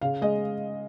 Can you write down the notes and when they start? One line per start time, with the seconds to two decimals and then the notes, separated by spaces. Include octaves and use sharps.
0.01 C#3 F5
0.22 G#3 D#5